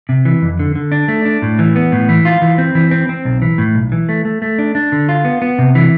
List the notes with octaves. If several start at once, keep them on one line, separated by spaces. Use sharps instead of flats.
C3
E3
F2
D3
D3
D4
A3
D4
A2
E3
B3
A2
E3
F4
E3
C4
E3
C4
C4
B1
E3
A2
B1
E3
A3
A3
A3
D4
D4
D3
F4
B3
B3
C3
E3